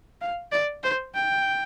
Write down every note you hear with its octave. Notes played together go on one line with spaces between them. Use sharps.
F5
D5
C5
G5